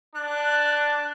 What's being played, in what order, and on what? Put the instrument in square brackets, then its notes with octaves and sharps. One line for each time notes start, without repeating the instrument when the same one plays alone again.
[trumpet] D4 [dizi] F#6